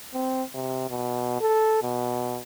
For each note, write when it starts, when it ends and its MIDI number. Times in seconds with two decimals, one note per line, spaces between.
0.14 0.43 60
0.54 0.86 48
0.90 1.38 47
1.40 1.80 69
1.83 2.40 47